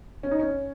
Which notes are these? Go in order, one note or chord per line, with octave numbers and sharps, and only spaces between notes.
C#4
D#4
C#4